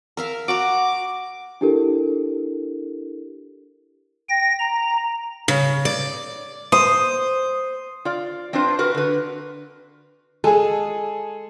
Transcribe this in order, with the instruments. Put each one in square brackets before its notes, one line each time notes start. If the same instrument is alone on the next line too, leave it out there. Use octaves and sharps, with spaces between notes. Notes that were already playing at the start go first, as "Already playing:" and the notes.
[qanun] A#4 E5 F5
[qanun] F#4 F#5 A#5 [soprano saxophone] D6
[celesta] D4 E4 G4 A4 A#4
[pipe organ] G5 A#6
A#5
[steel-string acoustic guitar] C#3
D5
[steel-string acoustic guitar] C5 [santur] D#6
[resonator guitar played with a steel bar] F4 D5
C4 D4 F4 B4 C5
F#4 A#4 B4
D3 B4
[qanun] G#3 [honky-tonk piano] G#4 A4